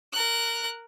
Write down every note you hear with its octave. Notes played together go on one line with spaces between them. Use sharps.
A#4 F#6